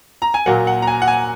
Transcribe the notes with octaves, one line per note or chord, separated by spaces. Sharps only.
A#5
G#5
A#2 F#3 A#3 F#5
F#5
A#5
G#5
F#5
G#5